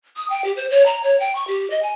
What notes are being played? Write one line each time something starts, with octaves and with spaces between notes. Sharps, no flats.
D#6
G5
G4
C5
C#5
A#5
C#5
G5
C#6
G4
D#5
G#5